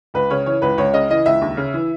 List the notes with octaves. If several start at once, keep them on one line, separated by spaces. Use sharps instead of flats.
C#2 B4
C#3 C#5
E3 C#5
C#2 B4
C#2 C#5
C#3 D#5
E3 D#5
C#2 E5
D#2
C#3
E3